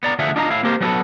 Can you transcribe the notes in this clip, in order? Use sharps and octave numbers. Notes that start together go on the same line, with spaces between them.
B3 D5 A#5
D2 D3 F3 G#4 E5 F#5
D4 F4 D#5 F5 A5 A#5
A2 E4 F5
A#3 C4 G4 A#4 C5
F#3 G3 B3 F#4 A4 B4